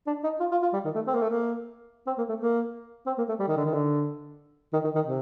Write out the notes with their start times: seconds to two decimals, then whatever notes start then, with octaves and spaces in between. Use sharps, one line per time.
0.07 D4
0.24 D#4
0.40 F4
0.51 F4
0.63 F4
0.73 G3
0.85 D#3
0.95 A3
1.07 C4
1.14 A#3
1.22 A3
1.29 A#3
2.07 C4
2.18 A#3
2.29 A3
2.40 A#3
3.07 C4
3.18 A#3
3.29 A3
3.40 G3
3.48 D#3
3.57 D3
3.65 D#3
3.73 D3
4.73 D#3
4.84 D#3
4.95 D#3
5.06 C3